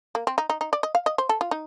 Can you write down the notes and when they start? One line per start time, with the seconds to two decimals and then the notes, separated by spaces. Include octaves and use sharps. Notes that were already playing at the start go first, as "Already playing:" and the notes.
0.15 A#3
0.27 C4
0.38 D#4
0.50 D#4
0.61 D#4
0.73 D5
0.83 D#5
0.95 F5
1.06 D#5
1.18 C5
1.29 A4
1.41 F4
1.51 D#4